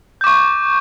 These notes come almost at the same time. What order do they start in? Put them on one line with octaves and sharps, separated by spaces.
G6 D6 C#6